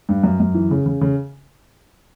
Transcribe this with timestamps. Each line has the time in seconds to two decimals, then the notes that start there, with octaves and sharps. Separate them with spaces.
0.09 G2
0.23 F#2
0.40 F#2
0.55 E3
0.71 C#3
0.86 C#3
1.01 C#3